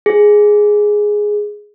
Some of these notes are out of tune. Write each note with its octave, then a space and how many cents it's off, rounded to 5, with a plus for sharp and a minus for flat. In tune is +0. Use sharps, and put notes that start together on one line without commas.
G#4 +0